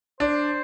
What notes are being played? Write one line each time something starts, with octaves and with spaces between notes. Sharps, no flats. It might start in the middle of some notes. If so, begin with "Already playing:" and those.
D4 C5